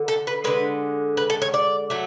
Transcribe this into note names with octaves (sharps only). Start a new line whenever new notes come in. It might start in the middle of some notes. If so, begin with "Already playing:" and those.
Already playing: D3
A4
B4
D3 G#3 B4
B4
A4
C#5
D5
F#3 A3